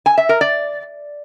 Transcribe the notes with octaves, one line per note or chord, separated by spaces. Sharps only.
G#5
E5
A#4
D5